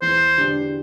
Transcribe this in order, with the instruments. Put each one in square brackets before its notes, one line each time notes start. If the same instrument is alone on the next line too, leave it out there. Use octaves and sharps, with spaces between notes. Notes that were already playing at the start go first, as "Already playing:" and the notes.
[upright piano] E2 [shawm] C5
[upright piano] D3 G3 D4